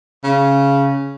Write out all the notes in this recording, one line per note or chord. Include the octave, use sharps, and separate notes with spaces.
C#3